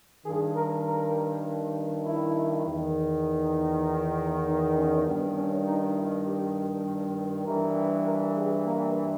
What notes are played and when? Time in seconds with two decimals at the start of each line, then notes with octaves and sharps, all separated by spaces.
0.25 G2 D#3 G#4
0.55 A#4
0.85 A#4
2.05 E4
2.65 E2 D#3
3.86 E4
4.45 D#4
4.76 C#4
5.05 G2 D#3 B3
5.35 C#4
5.65 D#4
5.95 E4
6.25 G4
7.46 G2 E3 A#4
8.06 A#4
8.35 G#4
8.65 A#3